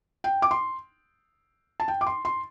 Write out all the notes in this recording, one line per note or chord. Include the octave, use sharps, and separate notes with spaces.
G5
D6
C6
A5
G5
D6
C6
C6